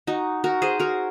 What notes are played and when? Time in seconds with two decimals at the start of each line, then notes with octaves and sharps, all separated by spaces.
0.07 D#4 F#4
0.44 F#4 A#4
0.62 G#4 C5
0.79 F#4 A#4